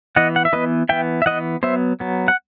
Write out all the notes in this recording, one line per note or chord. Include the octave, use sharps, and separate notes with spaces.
E3 B3 D#5 F#5
F#5
E5
E3 B3 B4 D#5
E3 B3 E5 G5
E5
E3 B3 D#5 F#5
F#3 B3 C5 E5
F#3 B3
F#5